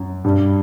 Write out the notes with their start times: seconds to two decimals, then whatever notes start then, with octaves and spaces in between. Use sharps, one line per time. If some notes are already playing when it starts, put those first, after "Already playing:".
Already playing: F#2
0.24 G2